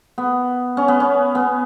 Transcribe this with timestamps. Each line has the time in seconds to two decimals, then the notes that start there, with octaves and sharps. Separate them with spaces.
0.18 B3
0.77 C#4
0.88 B3
1.00 C#4
1.35 B3